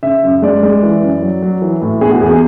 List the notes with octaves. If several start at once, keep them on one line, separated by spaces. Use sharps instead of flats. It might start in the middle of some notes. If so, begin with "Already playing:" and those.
C#3 E5
F#2
G#3 D5
G#3
E3
F#2
F#3
F#3
E3
A2
B2 G#4
F#4
E2 G#4
G#4